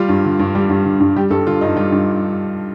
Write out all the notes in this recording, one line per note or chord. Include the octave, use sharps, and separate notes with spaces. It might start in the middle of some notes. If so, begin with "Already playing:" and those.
Already playing: G3 F4
G2
D3
G2
G3
G2
D3
G2
G3 G4
G2 A4
D3 F4
G2 D#4
G3 F4
G2